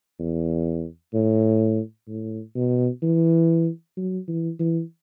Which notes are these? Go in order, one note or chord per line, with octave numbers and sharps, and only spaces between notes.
E2
A2
A2
B2
E3
F#3
E3
E3